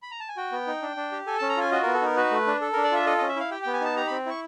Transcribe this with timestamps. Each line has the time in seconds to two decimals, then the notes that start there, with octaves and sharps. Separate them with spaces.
0.02 B5
0.11 A#5
0.20 A5
0.28 G#5
0.37 F#4 G5
0.52 B3
0.67 D#4
0.82 D4
0.96 D4
1.12 G4
1.26 A4 G#5
1.38 C#4 A5
1.49 A#5
1.57 F4 G#5
1.71 F#4 D#5
1.83 B3 A#4
1.94 A4
2.01 D#4 A#4
2.16 F#4 B4
2.31 A3
2.47 D4
2.61 A4
2.73 D4 A#4
2.84 D5
2.91 F4 E5
3.06 A4 D#5
3.18 C#4 D#5
3.28 E5
3.36 E4 F5
3.51 G4 G5
3.63 B3 G5
3.73 G#5
3.81 D#4 A5
3.96 G4 A#5
4.07 C4 B5
4.26 E4 C#6